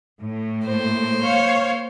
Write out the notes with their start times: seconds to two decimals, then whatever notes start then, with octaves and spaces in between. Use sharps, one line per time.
0.21 A2
0.66 A#3 C5
1.22 C#5 F5